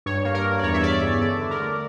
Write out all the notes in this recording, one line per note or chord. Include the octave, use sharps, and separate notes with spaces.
G2 C#5
A#3 C#5
A#4
G2
D5
E2 C#5
E5
E2 D5
C#3
D3 D5
D3
A#4
A3